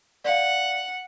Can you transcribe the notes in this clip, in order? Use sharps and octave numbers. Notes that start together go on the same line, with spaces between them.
D5 F5 F#5